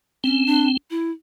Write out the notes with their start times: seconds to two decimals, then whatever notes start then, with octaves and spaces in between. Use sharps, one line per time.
0.24 C4 C#4
0.46 D4
0.90 E4